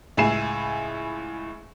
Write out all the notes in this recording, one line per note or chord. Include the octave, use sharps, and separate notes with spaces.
C#2 A2 E4 G#5 C7 E7